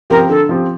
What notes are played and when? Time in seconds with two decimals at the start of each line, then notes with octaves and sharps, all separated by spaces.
0.10 F3 C4 G4 A#4
0.29 D3 A4
0.49 F3 C4 G4